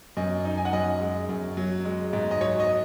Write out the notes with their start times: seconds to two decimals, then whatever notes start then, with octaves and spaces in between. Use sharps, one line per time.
0.17 F#2 D#5
0.45 D#4
0.57 G#5
0.65 F#5
0.73 F#2 D#5
1.01 G#3
1.29 F#2
1.57 F#3
1.85 G#3
2.13 G#2
2.31 D#5
2.41 F#3 C#5
2.60 D#5